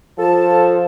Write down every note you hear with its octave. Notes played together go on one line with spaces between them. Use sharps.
F3 A4 A5